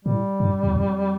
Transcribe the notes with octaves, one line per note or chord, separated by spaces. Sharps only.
A2 G3
G2
E2
F2